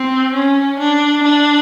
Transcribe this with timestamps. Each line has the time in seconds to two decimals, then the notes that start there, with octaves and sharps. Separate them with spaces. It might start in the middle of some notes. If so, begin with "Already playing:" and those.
Already playing: C4
0.34 C#4
0.79 D4
1.23 D4